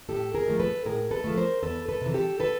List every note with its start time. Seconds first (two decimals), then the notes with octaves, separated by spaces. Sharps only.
0.09 A2 G4 A4
0.35 G#4 A#4
0.48 F3 A3
0.60 A4 B4
0.86 A2 G#4 A#4
1.11 A4 B4
1.24 F3 A3
1.37 A#4 C5
1.62 E2 A4 B4
1.89 A4 B4
2.01 C3 E3
2.14 G4 A4
2.40 A4 B4